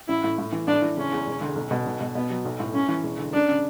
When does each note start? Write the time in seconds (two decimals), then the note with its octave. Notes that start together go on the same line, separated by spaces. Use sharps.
0.08 A1 E4
0.24 A2
0.38 A2
0.52 E3
0.67 A2 D4
0.82 E3
0.97 F#1 C#4
1.12 E2
1.27 E1
1.41 D2
1.56 B1
1.71 B2
1.86 B1
2.00 B2
2.15 B2 B3
2.30 F#3
2.45 B1
2.59 A2
2.74 F#2 C#4
2.88 E3
3.04 E1
3.18 D2
3.33 F#2 D4
3.48 C#3